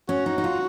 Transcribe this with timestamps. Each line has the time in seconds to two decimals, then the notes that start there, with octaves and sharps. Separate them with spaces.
0.09 C#4 F#4
0.26 D#4
0.38 D#4
0.44 F4